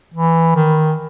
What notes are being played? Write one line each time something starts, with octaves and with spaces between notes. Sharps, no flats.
E3
D#3